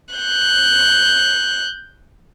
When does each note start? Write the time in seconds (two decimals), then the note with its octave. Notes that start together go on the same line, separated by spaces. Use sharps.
0.15 F#6 G6